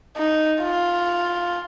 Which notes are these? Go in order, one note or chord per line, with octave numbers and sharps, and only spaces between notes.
D#4
F4